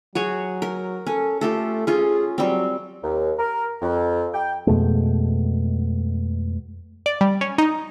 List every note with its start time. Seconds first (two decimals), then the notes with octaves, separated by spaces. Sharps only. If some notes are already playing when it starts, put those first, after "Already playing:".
0.15 F#3 F#4 G#4 C#5
0.62 A#4
1.07 C#4 A4
1.41 A3 F4 G4 A4
1.87 C#4 F4 G#4
2.38 F#3 G3 C4
3.03 D#2
3.39 A#4
3.81 F2
4.34 G5
4.67 F2 B2 G#3 A3
7.06 D5
7.21 G3
7.41 C#4
7.58 D#4